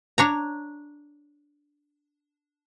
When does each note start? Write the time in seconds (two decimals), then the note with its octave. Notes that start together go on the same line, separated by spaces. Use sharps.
0.18 D4 C#5 A#5